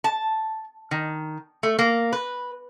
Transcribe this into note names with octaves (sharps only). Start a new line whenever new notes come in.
A5
D#3
A3
A#3
B4